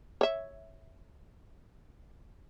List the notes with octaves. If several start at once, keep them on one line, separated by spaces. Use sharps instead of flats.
C#5 E5